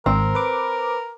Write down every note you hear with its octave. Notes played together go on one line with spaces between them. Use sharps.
G#1 C4 A#4
B4 D6